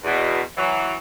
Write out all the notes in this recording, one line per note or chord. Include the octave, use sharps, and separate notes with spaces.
E2 B2
E3 F#3